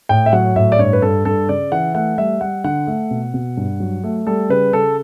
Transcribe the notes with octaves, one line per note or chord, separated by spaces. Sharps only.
A2 G5
E5
F#3 F#5
A2 E5
D5
G2 C#5
B4
G2 A4
G2 A4
C#3 D5
E3 F#5
A3 F#5
G3 E5
G3 F#5
D3 F#5
A3
B2
B2
G2
F#3
A3
G3 A4
C#3 B4
C#3 A4